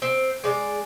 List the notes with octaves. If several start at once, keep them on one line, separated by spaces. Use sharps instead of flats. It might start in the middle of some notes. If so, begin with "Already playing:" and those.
C4
G#3 D5